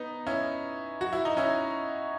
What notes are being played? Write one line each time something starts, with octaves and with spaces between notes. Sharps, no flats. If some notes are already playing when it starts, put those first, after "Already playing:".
Already playing: B3 D#4
C#4 E4
F#4
E4
D#4
C#4 E4